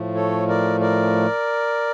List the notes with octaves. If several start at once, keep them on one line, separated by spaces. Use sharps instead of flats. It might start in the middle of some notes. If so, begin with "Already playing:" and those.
Already playing: A2 F3 A3
A4 C#5
A#4 D5
A#4 D5